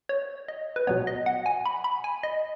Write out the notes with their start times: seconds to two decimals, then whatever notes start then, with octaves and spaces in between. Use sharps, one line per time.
0.09 C#5
0.48 D#5
0.76 B4
0.87 B2 F#3 B3 C#5
1.07 D#5
1.26 F#5
1.46 G#5
1.66 B5
1.84 B5
2.04 G#5
2.23 D#5